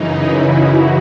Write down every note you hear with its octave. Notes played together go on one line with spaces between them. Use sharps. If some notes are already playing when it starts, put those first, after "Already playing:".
Already playing: F#2 C#3 E3 D#4
E4
F#4